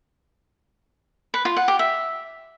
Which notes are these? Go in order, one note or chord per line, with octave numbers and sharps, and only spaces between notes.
B4
F4
F#5
G4
E5